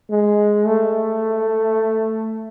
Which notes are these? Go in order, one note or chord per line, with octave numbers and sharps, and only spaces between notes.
G#3
A3